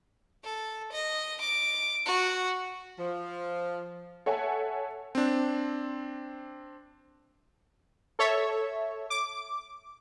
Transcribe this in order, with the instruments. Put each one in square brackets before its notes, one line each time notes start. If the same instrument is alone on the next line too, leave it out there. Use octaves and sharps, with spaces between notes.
[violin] A4
D#5
D6
F#4
[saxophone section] F3
[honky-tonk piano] A4 C#5 E5 F#5 G#5 A5
[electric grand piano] C4 D4
[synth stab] A4 C#5 E5
D6